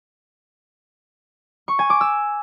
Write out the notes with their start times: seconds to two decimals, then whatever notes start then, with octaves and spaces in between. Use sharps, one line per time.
1.68 C#6
1.79 G#5
1.90 D6
2.01 E6